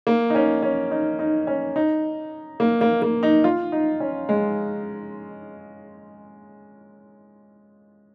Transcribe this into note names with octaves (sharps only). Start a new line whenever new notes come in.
A#3
D#4
C#4
C#4
D#4
D#4
C#4
D#4
A#3
A#3
A#3
D#4
F4
D#4
C#4
G#3